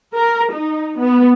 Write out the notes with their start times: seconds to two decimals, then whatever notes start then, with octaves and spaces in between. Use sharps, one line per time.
0.15 A#4
0.53 D#4
0.99 B3